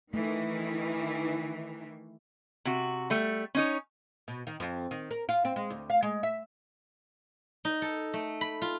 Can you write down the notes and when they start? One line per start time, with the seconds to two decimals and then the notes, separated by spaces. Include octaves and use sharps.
0.14 D#3 E3 A3
2.65 C3 F#4
3.10 G3 A3
3.55 C#4 D#4 C#5
4.28 B2
4.47 D#3
4.60 F2
4.91 D#3
5.11 A#4
5.29 F4
5.45 C4
5.56 G#3
5.70 D2
5.90 F5
6.03 G#3
6.23 E5
7.65 D#4
7.82 A4
8.14 A3
8.41 B5
8.62 F4